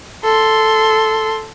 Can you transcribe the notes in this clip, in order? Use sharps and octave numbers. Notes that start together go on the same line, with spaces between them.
A4 C6